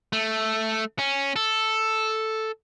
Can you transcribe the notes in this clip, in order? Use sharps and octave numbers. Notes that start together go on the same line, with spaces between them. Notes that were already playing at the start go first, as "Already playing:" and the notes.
A3
C#4
A4